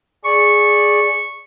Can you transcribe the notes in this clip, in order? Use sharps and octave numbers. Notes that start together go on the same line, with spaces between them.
G#4 D5 C#6